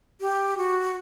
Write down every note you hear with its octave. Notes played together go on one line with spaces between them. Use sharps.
G4
F#4